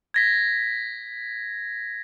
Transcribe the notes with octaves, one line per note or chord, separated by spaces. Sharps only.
G#6 A#6 B6